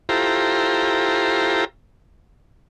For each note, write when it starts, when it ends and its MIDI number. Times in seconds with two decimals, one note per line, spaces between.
0.09 1.65 64
0.09 1.65 65
0.09 1.65 67
0.09 1.65 69
0.09 1.65 72
0.09 1.65 82